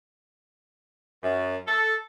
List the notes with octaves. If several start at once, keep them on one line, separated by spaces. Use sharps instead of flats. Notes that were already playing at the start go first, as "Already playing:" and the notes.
F#2
A4